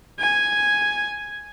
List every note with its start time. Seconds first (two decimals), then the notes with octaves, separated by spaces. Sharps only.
0.20 G#5